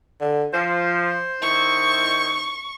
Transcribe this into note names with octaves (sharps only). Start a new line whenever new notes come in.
D3
F3 C5
D#3 D#4 E4 C#6